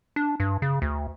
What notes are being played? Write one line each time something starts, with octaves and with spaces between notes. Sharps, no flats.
D4
G2
C#3
D2